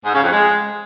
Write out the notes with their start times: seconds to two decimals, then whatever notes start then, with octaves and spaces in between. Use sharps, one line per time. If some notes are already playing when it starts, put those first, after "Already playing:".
0.05 G#2
0.14 C#3
0.23 F2
0.32 G#3